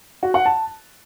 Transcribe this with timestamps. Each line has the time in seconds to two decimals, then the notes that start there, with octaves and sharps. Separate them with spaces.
0.23 F#4
0.34 F#5
0.46 A5